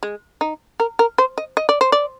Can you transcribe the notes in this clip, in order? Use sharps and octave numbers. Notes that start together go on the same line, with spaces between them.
G#3
D#4
A#4
A#4
C5
D#5
D#5
D5
C5
D5